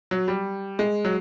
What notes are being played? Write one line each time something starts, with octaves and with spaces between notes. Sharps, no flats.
F#3
G3
G#3
F#3